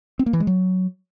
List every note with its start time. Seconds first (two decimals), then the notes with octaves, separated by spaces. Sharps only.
0.19 C4
0.26 A#3
0.33 E3
0.40 G#3
0.47 F#3